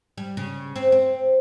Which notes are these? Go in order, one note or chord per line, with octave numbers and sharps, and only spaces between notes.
G3
C#3
C4
C4